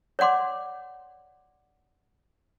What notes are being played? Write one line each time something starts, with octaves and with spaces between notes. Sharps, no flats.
C#5 D5 F#5 C6 D6